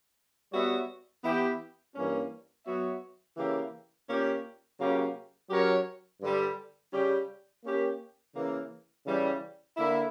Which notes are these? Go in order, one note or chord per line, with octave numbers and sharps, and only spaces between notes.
G3 B3 F#4 C#5 E5
E3 B3 E4 G4
G2 E3 A#3 C#4
F#3 B3 F#4 C#5 E5
C#3 E3 A#3 E4 G4
A#2 A#3 C#4 G4
C#3 F#3 A#3 C#4 G4
F#3 C#4 G4 A#4 C#5
G2 D3 G3
C#3 G3 C#4 G4
A#3 C#4 G4 A#4
C#3 E3 A#3
C#3 E3 G3
D3 A#3 E4